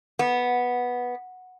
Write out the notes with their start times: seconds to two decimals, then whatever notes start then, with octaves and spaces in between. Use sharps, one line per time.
0.19 B3